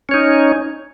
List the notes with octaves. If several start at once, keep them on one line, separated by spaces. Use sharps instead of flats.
C#4 D#4 C#5